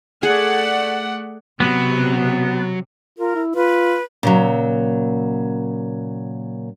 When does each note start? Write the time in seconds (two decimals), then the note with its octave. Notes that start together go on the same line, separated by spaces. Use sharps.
0.23 A3 G#4 D5 F#5
1.60 C3 F#3 B3
3.19 F4 A#4
3.35 E4
3.55 F4 B4
4.23 A#2 C#3 F#3